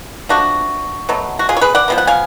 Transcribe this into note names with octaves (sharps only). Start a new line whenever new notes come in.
F3 A3 D4 F#4
B2 F#3 A3
F#4
F4 G#4
C#5
G#4 B4
D5 F#5
F3 G#3 B3
F#5
F5 G#5